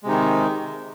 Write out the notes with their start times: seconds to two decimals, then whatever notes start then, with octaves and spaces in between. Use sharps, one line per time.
0.03 G#3
0.05 C3
0.08 D#4
0.11 D#3